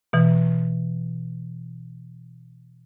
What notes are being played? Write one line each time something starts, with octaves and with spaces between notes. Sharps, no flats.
B2 E3